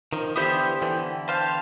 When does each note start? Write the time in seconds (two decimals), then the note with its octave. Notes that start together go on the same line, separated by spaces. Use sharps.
0.13 D#3 F3
0.36 D3 E3 B3 E4 G4 C5
0.82 D3 E3
1.28 G4 C5 F5 A5